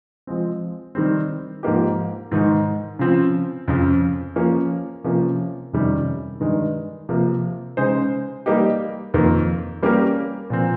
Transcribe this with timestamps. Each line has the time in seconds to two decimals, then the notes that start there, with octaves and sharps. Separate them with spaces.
0.27 F3 G#3 C4
0.95 D#3 G3 C4
1.63 G#2 F3 A#3 D#4 G4
2.31 G#2 D#3 G#3 D#4
2.99 C#3 F3 C4
3.68 F2 C#3 F3
4.36 F3 A#3 C#4
5.04 C3 F3 A#3 C#4
5.73 F2 C3 D#3 G3 C#4
6.40 G2 D#3 G#3
7.09 C3 F3 A#3
7.77 C#3 G#3 D#4 G#4 C5
8.46 G3 A#3 D#4 G4
9.14 F2 D#3 A#3
9.83 G3 A#3 C#4 G4 A#4
10.50 A#2 F3 C4